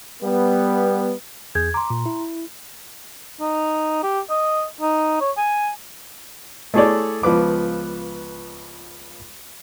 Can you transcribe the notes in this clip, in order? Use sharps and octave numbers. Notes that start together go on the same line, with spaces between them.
G3 B3
E2 G#4 G6 G#6
A#5 C6 D6
A#2
E4
D#4
G4
D#5
D#4
C#5
G#5
A3 E4 G#4 A4 C#5 D5
C#2 F3 B3 B4 D6